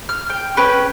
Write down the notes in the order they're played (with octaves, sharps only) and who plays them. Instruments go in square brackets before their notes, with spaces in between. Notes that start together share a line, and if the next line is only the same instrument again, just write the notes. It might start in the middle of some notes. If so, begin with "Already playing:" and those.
[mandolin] F6
G5
C#4 B4 G5